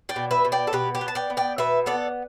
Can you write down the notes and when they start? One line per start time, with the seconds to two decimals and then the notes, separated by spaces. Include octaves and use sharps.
0.09 D5 G5
0.16 B2
0.31 B4 E5
0.45 B2
0.52 D5 G5
0.67 A4
0.73 B2 G4 B4
0.95 G4
1.01 B3
1.08 A5
1.15 D5 G5
1.30 B3
1.37 D5 G5
1.58 B2 B4 E5
1.86 B3 A4 D5